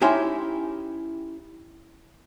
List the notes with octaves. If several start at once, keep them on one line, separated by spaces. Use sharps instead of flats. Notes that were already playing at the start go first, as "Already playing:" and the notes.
C#4 D#4 E4 G4 C#5 C6